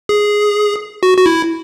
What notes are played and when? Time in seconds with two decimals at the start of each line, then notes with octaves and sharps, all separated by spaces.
0.09 G#4
1.03 F#4
1.18 F#4
1.26 E4